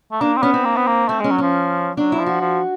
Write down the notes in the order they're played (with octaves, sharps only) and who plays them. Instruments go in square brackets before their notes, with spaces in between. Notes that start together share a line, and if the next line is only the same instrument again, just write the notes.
[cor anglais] A3
[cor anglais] A#3 [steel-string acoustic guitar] D4
[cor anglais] C4
[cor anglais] B3 [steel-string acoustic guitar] C#4
[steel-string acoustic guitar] C4
[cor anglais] A#3
B3
A#3
[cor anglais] A3 [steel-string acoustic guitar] C4
[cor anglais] G#3 [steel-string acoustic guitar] C#4
[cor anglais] F#3
[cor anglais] F3 [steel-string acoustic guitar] C#4
[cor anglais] F#3 [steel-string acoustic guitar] D4
[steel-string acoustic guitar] E4
[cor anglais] F3
[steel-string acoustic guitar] F#4
[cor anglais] F3